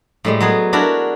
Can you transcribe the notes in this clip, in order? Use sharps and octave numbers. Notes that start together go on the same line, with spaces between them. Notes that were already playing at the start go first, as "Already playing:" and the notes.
A2 G3 G#3
F#3 B3 G#4
D4 E4 F#4 A#4